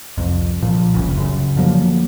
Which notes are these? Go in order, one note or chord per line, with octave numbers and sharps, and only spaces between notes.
C2 F2
A#2 F3
F1 C2 C#3
F#2 C#3
D3 F3 F#3 A#3